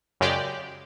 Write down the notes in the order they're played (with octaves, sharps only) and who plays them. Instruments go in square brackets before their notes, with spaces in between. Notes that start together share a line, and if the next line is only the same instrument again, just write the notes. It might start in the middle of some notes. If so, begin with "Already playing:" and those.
[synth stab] F#2 C#3 G#3 G4 D5